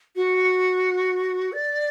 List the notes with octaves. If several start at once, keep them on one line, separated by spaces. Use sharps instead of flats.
F#4
D5